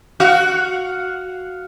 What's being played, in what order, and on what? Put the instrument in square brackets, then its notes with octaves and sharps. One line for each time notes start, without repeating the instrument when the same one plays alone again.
[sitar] F#4 [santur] F5 F#5